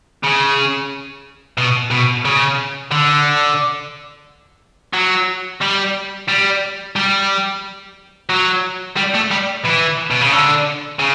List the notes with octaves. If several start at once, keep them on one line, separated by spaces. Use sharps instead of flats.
C#3
B2
B2
C#3
D3
F#3
G3
G3
G3
F#3
G3
A3
G3
E3
B2
C#3
D3
C#3